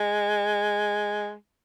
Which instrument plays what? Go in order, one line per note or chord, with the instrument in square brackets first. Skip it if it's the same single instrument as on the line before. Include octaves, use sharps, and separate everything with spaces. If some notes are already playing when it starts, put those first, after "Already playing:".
Already playing: [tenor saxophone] G#3